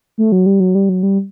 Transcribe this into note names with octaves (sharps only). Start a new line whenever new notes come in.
A3
F#3
G3
F#3
G3
F#3
G3